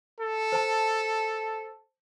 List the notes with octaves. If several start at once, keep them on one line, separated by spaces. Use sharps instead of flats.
A4
C5 A5